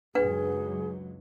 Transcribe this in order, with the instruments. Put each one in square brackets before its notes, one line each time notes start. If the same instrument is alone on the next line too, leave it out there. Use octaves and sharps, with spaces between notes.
[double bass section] C#2 F#2 F#3 [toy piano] D4 B4 F#5 [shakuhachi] G#4